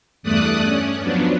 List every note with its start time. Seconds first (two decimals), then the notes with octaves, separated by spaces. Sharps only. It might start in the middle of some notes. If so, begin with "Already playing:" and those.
0.23 E2 G2 A3 D5 D#6 F#6
0.64 C#4
1.02 F3 F#3 B3 D4